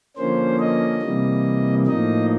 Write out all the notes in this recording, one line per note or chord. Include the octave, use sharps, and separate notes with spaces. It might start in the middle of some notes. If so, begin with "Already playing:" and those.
D3 F3 A#3 C#4 C5
D#5
C3 E3 G3 A#3
A2 F3 A#3 D#4 D#5